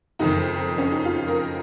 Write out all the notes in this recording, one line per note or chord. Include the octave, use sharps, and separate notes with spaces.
F#1 F2 D#3 D#4
C#4
D#4
F4
A#4